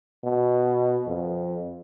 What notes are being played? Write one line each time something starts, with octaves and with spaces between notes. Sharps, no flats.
B2
F2